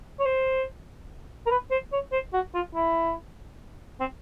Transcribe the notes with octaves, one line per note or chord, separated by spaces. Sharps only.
C#5
C5
A#4
B4
C5
C#5
C5
F#4
F4
E4
C4